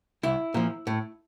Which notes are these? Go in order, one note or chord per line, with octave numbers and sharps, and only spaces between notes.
C2 E4
A#2 F3
A2